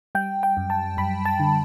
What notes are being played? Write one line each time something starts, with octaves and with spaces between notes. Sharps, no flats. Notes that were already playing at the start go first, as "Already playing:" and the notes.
G3 G5
G5
F#2
A5
F#2 B5
A5
D3